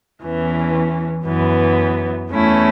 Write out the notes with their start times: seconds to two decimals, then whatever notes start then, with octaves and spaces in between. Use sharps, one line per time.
0.23 E2 E3 C#4
1.26 F#2 E3 B3
2.31 E2 E3 A3 C#4 E4